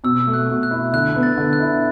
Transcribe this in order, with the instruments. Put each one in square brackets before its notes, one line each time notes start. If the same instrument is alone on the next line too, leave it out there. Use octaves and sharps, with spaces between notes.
[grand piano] B2 [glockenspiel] E6
[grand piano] A3
[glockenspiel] F#6
[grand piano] B2
[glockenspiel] F#6
[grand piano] E4
[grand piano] D3 [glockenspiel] F#6
[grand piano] B3
[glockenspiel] A6
[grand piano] D3
[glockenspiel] F#6
[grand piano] E4